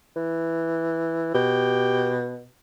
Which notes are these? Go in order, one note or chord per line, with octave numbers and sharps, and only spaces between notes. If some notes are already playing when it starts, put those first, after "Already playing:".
E3
B2 G4